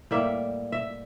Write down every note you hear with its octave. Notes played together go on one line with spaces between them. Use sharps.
A2 G3 A#3 E5
E5